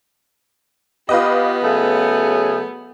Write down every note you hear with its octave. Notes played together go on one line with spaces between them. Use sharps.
B3 F4 G4 B4 D#5
C#3 F#3 A3 G#4